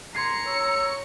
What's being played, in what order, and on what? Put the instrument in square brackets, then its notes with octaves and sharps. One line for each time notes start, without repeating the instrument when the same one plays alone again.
[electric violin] A#5 C#7 [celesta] C6 G#6 C7
[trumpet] C#5 [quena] E6